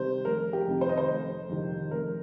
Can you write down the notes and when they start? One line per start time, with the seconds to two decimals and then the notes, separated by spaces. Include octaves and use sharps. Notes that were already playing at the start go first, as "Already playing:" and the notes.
Already playing: C3 D#3 G3 C5
0.25 F1 A#4
0.53 G4
0.67 F2 C3 D#3
0.81 C5
0.89 D#5
0.97 C5
1.09 F1
1.49 F2 C3 D#3
1.91 F1 A#4